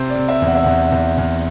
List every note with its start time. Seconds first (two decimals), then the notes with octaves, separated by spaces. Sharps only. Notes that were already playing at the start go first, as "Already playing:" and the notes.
Already playing: C3 C5
0.10 D5
0.15 C3
0.29 E5
0.42 E2
0.47 F#5
0.55 E5
0.63 E2 F#5
0.92 E2
1.18 E2